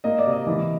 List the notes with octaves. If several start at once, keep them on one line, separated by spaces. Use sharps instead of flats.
A#3 D#5
D5
C3
D#5
E3